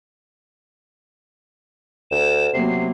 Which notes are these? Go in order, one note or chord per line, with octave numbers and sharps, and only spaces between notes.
D2 E7
C3 F#3 A#3 B3 C7